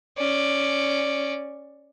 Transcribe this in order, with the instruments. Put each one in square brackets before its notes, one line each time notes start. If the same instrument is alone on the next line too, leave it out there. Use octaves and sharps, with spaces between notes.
[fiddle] C#4 D5